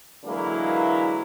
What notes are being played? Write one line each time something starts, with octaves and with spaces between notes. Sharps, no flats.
D3 E3 F#3 G#3 A#3 E4